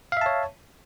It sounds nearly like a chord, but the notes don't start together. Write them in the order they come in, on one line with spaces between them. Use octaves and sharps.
F5 E5 A5 C#5